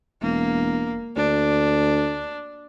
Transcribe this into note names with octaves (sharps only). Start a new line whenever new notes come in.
E1 A#3
D2 D4